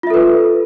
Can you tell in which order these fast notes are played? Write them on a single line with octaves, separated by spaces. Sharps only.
F4 E5 A4 B4